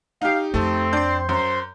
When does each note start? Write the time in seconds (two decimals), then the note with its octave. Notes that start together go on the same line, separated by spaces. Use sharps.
0.22 D#4 G4 F5
0.54 F2 A3 C4 A4
0.93 D4 C6 G6
1.29 F#2 C5